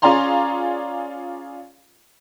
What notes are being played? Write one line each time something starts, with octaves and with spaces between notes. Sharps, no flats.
C#4 F4 G#4 D5 A#5 C6